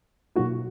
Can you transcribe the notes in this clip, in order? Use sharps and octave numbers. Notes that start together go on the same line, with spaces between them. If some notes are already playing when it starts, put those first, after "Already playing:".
B2 F#3 A#3 D#4 F#4